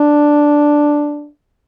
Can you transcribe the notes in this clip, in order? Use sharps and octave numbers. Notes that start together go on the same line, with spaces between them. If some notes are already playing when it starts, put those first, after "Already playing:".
Already playing: D4